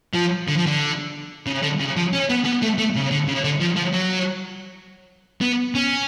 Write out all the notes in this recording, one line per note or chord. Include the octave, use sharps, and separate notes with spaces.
F3
D3
F3
D3
C#3
D3
C#3
F3
C#4
B3
B3
A3
A3
C#3
D3
C#3
D3
F3
F3
F#3
B3
C#4